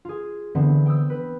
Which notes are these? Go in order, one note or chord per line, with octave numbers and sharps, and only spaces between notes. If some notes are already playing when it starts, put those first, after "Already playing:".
F4 G#4
D3 E3 B3 C4
G5 D#6 E6
B4